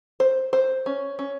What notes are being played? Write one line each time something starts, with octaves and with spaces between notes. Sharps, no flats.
C5
C5
C#4
C#4